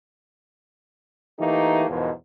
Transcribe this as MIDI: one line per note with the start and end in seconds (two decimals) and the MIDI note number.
1.39 1.86 52
1.39 1.86 57
1.39 1.86 58
1.39 1.86 63
1.39 1.86 67
1.89 2.10 40
1.89 2.10 44
1.89 2.10 47
1.89 2.10 51
1.89 2.10 53